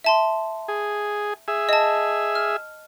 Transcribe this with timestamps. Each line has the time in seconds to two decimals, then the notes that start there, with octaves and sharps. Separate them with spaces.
0.04 E5 A5 C6
0.68 G#4
1.48 G#4 E5
1.69 D#5 A5
2.35 F6